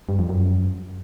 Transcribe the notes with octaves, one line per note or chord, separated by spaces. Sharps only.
G2
F2
F#2